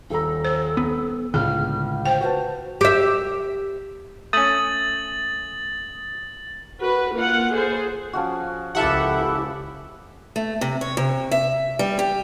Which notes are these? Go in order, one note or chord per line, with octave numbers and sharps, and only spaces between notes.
D#1 A4 A#5
C5
B3
C#2 A2 D3 G#4 F6
C5 G5
F#4 B4 C5 A5
G4 E5
A3 C#4 D#6 A6 F#7
F#4 B4
A#3 F4 F#5
G#4 A4 C5
F3 C#4 F#4
C#2 F3 E4 G4 A4 A#4 E5 F#5
A3
C3
C#5
C3
E5
G3
G4